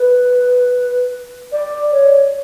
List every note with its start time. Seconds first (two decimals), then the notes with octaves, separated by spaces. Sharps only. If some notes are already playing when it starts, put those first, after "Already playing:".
Already playing: B4
1.52 D5
1.92 C#5